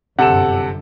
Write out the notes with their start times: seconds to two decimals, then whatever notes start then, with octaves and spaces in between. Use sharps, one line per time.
0.19 G1 F#2 C3 A4 F#5 E7